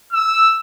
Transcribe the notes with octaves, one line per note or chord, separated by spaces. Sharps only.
E6